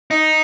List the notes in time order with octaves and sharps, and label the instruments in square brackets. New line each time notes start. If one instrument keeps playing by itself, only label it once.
[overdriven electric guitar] D#4